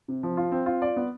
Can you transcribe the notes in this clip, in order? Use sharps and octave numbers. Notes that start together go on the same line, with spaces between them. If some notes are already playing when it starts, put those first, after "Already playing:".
C3
F3
F4
C4
F4
D5
B3